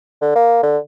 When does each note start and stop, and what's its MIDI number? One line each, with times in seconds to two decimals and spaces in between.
0.21 0.32 50
0.36 0.62 58
0.63 0.78 50